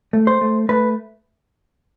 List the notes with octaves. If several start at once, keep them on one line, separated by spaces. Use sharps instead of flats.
A3
C5
A3
A3 B4